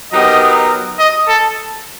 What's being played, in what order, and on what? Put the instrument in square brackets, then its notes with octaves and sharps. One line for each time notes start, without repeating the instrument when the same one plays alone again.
[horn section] F#3 B3 D#4 G4 A#4 [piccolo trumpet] D#5
[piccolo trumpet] D#5
A4